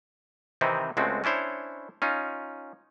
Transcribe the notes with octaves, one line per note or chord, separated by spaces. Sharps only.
C3 D#3 E3 C4 D#4 E4
C#2 G#3 A3 C4 F#4
C#4 D4 E4 C5 C#5
C#4 D#4 F4